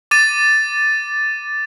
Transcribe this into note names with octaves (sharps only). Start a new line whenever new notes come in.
D6 A6 D#7